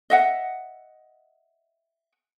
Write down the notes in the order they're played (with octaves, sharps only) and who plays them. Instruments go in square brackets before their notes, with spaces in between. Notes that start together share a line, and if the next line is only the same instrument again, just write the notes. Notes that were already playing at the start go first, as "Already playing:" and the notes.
[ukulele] D#5 E5 F#5